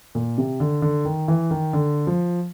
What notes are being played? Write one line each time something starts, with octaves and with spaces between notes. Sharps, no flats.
A#2
C3
D3
D3
D#3
E3
D#3
D3
F3